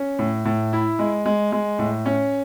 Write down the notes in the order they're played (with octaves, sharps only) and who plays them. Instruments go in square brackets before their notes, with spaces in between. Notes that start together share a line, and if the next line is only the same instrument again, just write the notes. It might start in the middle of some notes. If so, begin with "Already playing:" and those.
Already playing: [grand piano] C#4
A2
A2
E4
G#3
G#3
G#3
A2
C#4